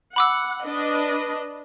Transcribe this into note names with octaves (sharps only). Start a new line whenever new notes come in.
F#5 B5 D6 E6
D4 B4 D#5